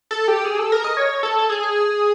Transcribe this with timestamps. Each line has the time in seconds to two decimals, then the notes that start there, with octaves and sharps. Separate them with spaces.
0.11 A4
0.28 G4
0.45 G#4
0.59 A4
0.72 A#4
0.84 D#5
0.97 C#5
1.23 A4
1.39 A4
1.50 G#4